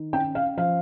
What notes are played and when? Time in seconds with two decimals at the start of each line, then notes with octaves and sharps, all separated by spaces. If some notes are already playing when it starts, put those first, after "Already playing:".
Already playing: D#3
0.13 C#4 G5
0.35 F5
0.57 F3 F5